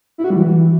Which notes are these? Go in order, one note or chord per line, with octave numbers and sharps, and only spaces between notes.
E4
F#4
G3
E3